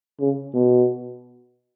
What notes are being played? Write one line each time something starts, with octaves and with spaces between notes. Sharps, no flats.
C#3
B2